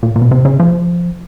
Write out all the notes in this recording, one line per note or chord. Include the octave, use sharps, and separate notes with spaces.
A#2
A#2
B2
C3
C#3
F3